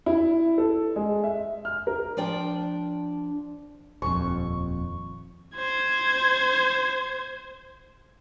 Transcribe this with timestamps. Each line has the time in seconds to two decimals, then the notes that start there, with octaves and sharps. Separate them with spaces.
0.06 E4
0.58 A4
0.96 G#3
1.24 E5
1.65 F6
1.87 A#4
2.17 F3 D4 D5 G5
4.02 D#1 F2 C#6
5.56 C5 G#6